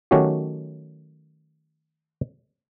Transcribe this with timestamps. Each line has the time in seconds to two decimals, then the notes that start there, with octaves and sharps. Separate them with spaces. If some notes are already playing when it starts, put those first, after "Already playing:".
0.11 D#3 F#3 A3 C#4 F#4 G4